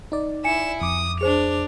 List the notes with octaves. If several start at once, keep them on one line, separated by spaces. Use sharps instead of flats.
D#4 D5
E4 G#5 C#7 E7
F2 D6 D#6
D4 G#4 C5 F7